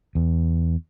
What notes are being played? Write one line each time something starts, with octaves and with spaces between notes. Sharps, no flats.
E2